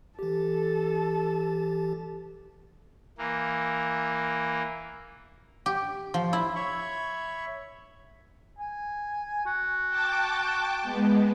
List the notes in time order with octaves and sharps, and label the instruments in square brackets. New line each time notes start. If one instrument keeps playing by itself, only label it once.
[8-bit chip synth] E3 G4 [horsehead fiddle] A4 A5
[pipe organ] E3 A#3
[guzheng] G4
F3
E4
[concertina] C#5 E5 B5 C#6
[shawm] G#5
F#4
[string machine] G5 A5 D6
G#3 B3